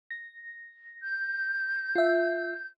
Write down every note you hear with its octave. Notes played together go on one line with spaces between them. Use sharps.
A#6
G6
F4 E5